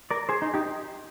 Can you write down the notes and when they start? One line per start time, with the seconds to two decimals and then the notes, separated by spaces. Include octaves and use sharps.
0.11 A#4 D5
0.29 G#4 C5
0.42 D#4
0.54 D#4 G4